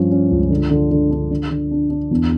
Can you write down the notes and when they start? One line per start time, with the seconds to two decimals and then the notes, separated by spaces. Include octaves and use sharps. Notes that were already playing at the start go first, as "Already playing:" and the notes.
Already playing: G2 F3 C#4
0.11 C#4
0.31 C#2
0.50 D3
0.71 D3
0.91 D3
1.11 D4
1.31 D3
1.51 D3
1.71 D4
1.90 D4
2.11 E2